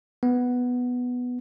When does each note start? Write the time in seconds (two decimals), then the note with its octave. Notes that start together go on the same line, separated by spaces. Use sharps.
0.23 B3